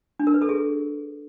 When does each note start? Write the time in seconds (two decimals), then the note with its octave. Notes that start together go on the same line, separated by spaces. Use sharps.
0.19 D4
0.27 A#4
0.34 B4
0.42 A4
0.49 G#4